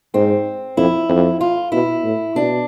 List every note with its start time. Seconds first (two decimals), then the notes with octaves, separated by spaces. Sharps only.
0.14 G#2 C4
0.77 F2 E4
1.09 F2
1.41 F4
1.72 B2 E4
2.04 A2
2.35 B2 D4